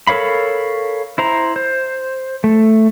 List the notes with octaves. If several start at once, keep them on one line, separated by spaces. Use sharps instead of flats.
A4 A#4 C#5 F5 B5
E4 C5 A#5
C5
A3